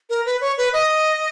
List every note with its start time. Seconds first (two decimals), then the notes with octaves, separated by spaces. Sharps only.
0.10 A#4
0.26 B4
0.41 C#5
0.58 B4
0.73 D#5